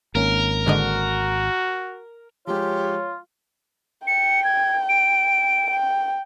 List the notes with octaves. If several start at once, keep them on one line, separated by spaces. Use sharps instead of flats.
G#1 A#3 C#4 A#4
G#2 D3 F#4 D#5
F3 G#3 F4 G4 C#5
G5 C#7
G#6
D7
G5